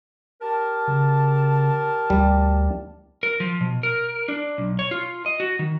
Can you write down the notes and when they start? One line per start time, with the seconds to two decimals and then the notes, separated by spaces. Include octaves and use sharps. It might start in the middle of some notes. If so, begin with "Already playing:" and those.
0.41 G4 A#4 A5
0.88 C#3
2.10 D2 G3
3.23 A#4
3.40 F3
3.61 B2
3.83 A#4
4.28 D4
4.58 B1
4.79 C#5
4.91 F4
5.26 D#5
5.40 F#4
5.59 D#3